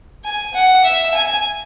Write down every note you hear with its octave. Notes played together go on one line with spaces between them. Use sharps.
G#5
F#5
E5
G#5